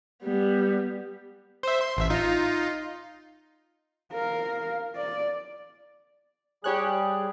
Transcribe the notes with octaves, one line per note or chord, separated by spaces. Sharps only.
G3 B3
C5 E5
C6
A1 E5
D#4 F4
A#4 F5
D5
G3 G4 G#4 C#5 F#6